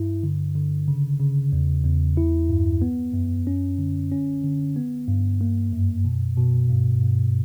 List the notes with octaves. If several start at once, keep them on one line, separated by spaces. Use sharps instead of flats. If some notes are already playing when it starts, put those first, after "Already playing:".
Already playing: G2 E4
D3
D3
C#3
C#3
E2
E2
E4
G2
B3
F#2
C#4
D3
C#4
D3
B3
G2
A#3
F#2
B2
B2
G2
G2